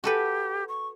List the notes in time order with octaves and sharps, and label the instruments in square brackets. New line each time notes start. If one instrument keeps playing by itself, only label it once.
[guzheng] F#4 A4 B4 [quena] G4
[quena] C#6